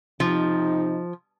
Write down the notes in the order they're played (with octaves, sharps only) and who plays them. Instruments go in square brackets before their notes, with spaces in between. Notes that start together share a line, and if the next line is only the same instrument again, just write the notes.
[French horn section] C3 D#4 [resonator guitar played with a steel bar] F3